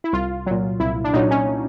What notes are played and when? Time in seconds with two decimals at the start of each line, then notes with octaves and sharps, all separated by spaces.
0.04 E4
0.13 C2 F4
0.46 A#2 F#3
0.80 C2 E4
1.04 D4
1.13 A#2 F#3 D#4
1.31 C#4